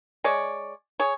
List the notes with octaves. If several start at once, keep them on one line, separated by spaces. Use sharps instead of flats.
G#3 C#5 D5
G#4 C#5